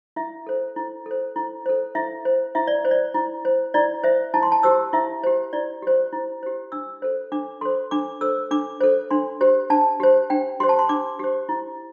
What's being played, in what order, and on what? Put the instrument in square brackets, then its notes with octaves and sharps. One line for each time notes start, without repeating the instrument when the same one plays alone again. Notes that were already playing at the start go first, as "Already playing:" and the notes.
[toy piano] E4 E5
A4 C5
E4
A4 C5
E4
A4 C5
E4 E5
C5
E4 E5
D5
C5
D5
E4
C5
E4 D5
C5 E5
E4 A5
C6
A5
G4 C5 E6
E4 E5
G4 C5
E4 D5
G4 C5
E4
G4 C5
D4 E6
A4 C5
D4 D6
A4 C5 C6
D4 D6
A4 C5 E6
D4 D6
A4 C5
D4 C6
G4 C5
D4 A5
G4 C5
D4 G5
G4 C5 C6
A5
C6
D4 D6
G4 C5
E4